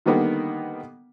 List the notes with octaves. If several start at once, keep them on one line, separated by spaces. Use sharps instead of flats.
D3 D#3 G3 A#3 B3